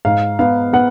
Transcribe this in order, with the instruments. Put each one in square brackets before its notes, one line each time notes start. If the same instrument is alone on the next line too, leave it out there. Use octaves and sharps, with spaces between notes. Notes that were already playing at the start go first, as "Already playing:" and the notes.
[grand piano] G#2 F5
B3 F5
B3 F#5